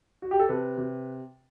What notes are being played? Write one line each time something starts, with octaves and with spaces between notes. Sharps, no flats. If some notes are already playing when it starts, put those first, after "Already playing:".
F#4
G4
A4
C3 B4
C3